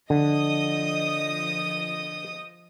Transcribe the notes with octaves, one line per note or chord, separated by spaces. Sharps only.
D3 F3 D#5 D#6